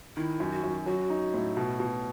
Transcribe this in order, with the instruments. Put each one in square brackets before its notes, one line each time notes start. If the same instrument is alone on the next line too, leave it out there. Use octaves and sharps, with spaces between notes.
[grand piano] D#3 [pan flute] E4
[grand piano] F#2
[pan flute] F#4
[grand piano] F#2
[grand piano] F#3 [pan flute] F#4
[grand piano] D#4
A2
B2
B2